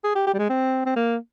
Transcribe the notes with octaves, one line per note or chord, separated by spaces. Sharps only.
G#4
G4
G4
G3
G#3
C4
C4
A#3